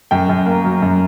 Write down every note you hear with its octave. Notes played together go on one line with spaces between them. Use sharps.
F#2 G5
F#2
A#3
F#3
F#2